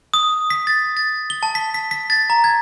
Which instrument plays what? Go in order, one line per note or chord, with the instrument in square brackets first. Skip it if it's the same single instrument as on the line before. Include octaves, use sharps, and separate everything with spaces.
[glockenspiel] D#6
B6
A6
A6
G7
A5
B6
B6
B6
A6
A#5
G#6